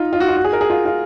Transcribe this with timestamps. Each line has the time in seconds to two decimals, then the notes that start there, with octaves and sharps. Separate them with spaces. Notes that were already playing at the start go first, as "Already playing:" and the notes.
Already playing: D#4 F4
0.13 F4
0.20 F#4
0.28 F4
0.37 F#4
0.44 G#4
0.53 A#4
0.61 G#4
0.70 F4
0.85 F4